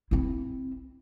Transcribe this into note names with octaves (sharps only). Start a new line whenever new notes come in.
C4 E4